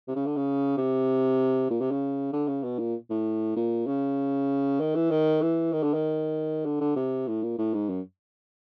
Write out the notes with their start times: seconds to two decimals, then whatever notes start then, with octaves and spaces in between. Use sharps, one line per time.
0.08 C3
0.16 C#3
0.26 D3
0.36 C#3
0.77 C3
1.70 A#2
1.81 C3
1.91 C#3
2.33 D3
2.48 C#3
2.64 B2
2.79 A#2
3.10 A2
3.56 A#2
3.87 C#3
4.80 D#3
4.95 E3
5.11 D#3
5.42 E3
5.72 D#3
5.83 D3
5.93 D#3
6.65 D3
6.81 D3
6.96 C3
7.28 A2
7.43 A#2
7.58 A2
7.74 G#2
7.89 F#2